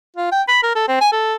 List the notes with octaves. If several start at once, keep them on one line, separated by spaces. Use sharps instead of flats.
F4
G5
B5
A#4
A4
C4
G#5
A4